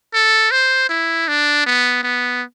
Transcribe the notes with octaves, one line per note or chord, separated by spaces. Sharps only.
A4
C5
E4
D4
B3
B3